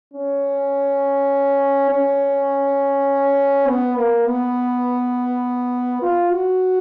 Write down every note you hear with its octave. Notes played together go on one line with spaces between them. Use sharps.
C#4
C#4
B3
A#3
B3
F4
F#4